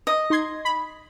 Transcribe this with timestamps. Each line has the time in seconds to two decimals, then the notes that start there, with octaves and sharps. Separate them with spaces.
0.07 D#5
0.30 D#4 C6 G#6
0.65 B5